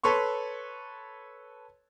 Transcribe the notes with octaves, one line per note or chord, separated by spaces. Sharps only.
A4 B4 C#5 C6 C#6